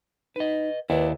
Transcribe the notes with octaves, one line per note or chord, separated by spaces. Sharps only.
D#4 B4 D#5
D#2 E4 B4 D5